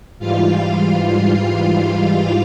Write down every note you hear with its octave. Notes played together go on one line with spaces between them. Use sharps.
G#2 E3 G3 F4 F5
F4 F5